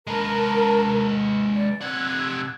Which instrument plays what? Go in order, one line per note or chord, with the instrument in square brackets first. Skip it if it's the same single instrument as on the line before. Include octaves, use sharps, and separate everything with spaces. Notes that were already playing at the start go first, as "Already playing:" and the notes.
[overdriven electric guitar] G#3 B4 [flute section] A#4 A5 A#5
[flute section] D5
[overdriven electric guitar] C3 F#5 [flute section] E6 F#6 G#6